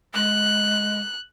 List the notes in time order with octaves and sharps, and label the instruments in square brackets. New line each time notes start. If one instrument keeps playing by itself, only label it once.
[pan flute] G#3 [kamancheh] F#6